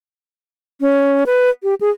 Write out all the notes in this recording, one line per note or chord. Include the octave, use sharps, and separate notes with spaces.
C#4
B4
G4
G#4